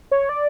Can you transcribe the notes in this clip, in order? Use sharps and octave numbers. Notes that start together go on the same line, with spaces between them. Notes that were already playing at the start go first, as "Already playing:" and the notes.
C#5
D5